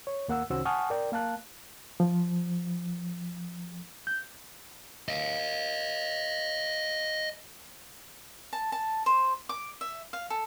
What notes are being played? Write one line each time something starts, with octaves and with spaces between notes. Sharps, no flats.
C#5
D#2 A#3 F#5 E6
C2 D#3 C#4 F#4 C5 E6
F#5 G#5 A5 C#6 D#6 F6
A#4 D5 G5
A#3 F5 A5 F#6
F3
G6
D#5 F5
A5
A5
C5
D6
E5
F5
A4